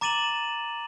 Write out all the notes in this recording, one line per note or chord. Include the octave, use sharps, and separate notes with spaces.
A#5 D6 A6 D#7 E7 F#7